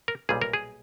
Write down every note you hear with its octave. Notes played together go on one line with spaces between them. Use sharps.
A#4
B1 A#2 G3 G#4
A#4
G#4